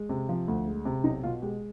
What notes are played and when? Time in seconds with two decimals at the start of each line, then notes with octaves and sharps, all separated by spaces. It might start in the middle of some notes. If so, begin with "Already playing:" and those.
Already playing: G#3
0.09 C3
0.29 F3
0.48 D2
0.67 G#3
0.85 C3
1.04 B1 D#4
1.23 B2 F4
1.42 G#3 G4